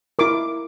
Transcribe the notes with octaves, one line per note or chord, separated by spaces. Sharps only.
E4 A#4 D6